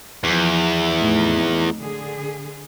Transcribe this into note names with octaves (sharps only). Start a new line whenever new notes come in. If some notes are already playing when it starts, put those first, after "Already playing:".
E2 F3
F2 A2 D#4
D3 G#4